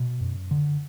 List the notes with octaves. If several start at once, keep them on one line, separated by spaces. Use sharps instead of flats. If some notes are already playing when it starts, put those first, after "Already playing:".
Already playing: B2
F#2
D3